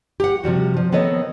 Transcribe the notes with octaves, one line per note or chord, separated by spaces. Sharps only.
G4 F#5
C3 F3 G3 F#4
F3
D#3 B3 C4 A4 C#5 D#5